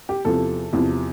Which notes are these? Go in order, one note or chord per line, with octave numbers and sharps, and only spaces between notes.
G4
E2 C3 F3 A4
E2 C3 F3